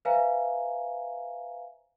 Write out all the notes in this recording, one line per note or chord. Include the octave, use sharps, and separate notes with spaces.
B4 C5 E5 F5 G#5 A#5